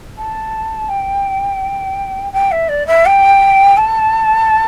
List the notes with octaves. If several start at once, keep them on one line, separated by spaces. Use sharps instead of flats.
A5
G5
G5
E5
D5
E5
G5
A5